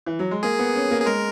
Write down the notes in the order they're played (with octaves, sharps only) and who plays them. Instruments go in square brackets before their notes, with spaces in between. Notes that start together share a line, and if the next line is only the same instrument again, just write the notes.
[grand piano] E3
F#3
G#3
[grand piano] A#3 [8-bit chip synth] G#4
[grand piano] B3
C#4
A#3
[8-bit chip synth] G#4
[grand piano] G#3 [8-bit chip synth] A#4